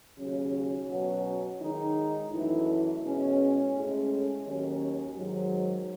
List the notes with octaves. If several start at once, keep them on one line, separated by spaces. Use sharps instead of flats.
D#2 C#3 F#3 C#4
B2 F#3 C#4 F#4 C#5
D#3 G#3 D#4
F#2 E3 A3 E4
B2 G#3 C#4
A2 G#3 C#4
D#2 D#3 F#3 C#4
G#2 D#3 F#3